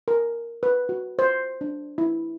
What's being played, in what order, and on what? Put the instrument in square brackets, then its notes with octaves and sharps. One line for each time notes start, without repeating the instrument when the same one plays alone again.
[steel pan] A#4
B4
F#4
C5
D4
E4